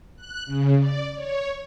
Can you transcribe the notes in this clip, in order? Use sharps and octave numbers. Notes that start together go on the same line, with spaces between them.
F#6
C#3
D5
C#5